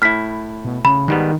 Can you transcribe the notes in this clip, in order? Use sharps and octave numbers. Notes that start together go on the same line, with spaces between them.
A2 E4 F6 B6
B2
C#3 B5
G#2 D#3 G3 B3